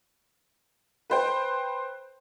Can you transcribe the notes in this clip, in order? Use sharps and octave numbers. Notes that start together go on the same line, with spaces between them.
B4 C5 G5